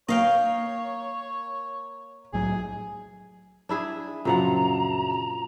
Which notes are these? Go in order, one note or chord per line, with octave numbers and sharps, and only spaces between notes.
A#3 C#5 D#5 F5 G5
C2 A2 F#3 G#4
D4 E4 G#4
F#2 A#2 C#3 F3 F#5 A#5